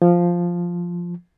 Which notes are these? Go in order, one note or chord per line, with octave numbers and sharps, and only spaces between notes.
F3